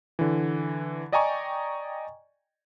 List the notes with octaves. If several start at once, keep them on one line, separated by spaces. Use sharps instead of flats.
D3 E3
D5 D#5 G5 G#5 A#5 C#6